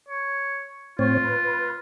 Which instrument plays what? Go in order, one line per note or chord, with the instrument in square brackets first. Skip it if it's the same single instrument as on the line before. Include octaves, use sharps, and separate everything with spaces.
[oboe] C#5
[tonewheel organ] A2 C4 C#5 [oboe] F4
[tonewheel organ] B4